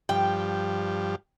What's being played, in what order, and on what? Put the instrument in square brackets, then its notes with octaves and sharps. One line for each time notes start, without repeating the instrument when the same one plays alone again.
[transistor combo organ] G2 F3 G4 [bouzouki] G5